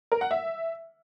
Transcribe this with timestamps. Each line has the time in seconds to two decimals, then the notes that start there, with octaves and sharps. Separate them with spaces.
0.12 A#4
0.21 F#5
0.31 E5